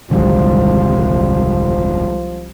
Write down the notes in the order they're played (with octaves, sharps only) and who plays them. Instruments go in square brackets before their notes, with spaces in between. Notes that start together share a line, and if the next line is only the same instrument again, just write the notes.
[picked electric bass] D#1 G#2 D3 [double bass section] C2 [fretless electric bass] D#3 F#3 G#3 [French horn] F3